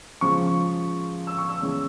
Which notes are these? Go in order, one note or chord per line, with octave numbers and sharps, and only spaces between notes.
C#3 F3 G#3 C#6
E6
C#6
E6
C#3 E3 G#3 C#4